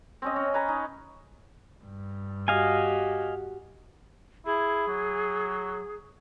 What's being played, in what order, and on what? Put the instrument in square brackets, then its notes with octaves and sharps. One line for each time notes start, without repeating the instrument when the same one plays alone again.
[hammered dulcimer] C4 C#4 D#5
C#4
B4 G#5 A#5
D#4
[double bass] G2
[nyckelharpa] F#4 G4 [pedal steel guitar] D#5 F5 G#5
[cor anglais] E4 [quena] G#4
[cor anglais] F#3